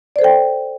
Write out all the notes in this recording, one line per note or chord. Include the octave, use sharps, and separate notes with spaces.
A4 C5 D5 G5